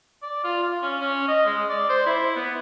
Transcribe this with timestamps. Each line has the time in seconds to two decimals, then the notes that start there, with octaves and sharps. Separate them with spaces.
0.23 D5
0.44 F4
0.63 F5
0.82 C#4
1.01 C#4
1.28 D#5
1.46 G#3
1.70 D5
1.89 C5
2.06 E4
2.36 B3